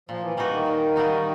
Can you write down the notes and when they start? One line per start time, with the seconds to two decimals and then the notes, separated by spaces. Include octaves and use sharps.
0.09 A#2 F3
0.23 E3
0.37 E3 G3 A#3 D#4 F#4
0.52 D#3
0.66 A#2
0.96 G3 A#3 D#4 F#4